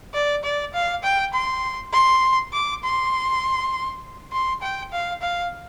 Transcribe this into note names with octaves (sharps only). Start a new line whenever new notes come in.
D5
D5
F5
G5
C6
C6
D6
C6
C6
G5
F5
F5